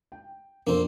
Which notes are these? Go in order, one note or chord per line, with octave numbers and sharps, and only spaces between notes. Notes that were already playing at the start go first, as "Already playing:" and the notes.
G5
F2 A#3 C4 D4 A4